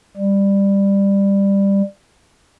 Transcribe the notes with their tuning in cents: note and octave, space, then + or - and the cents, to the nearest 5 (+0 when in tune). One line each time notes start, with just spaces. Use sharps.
G3 +15